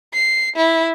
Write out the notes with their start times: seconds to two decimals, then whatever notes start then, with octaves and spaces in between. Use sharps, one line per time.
0.13 C7
0.56 E4